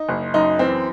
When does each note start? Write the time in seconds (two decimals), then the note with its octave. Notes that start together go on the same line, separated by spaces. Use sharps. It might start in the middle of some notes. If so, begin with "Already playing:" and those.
Already playing: D#4
0.09 F#1
0.34 F#2 D#4
0.59 E3 C4